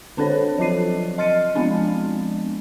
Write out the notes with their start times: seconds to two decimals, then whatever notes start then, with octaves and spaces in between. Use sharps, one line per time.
0.17 D3 C4 D4 A4 C5 C#5
0.58 F3 F#3 C4 F4 C7 D#7
1.18 D#5 C6 F6 A6 C#7 D#7
1.55 F3 G#3 B3 C4 D4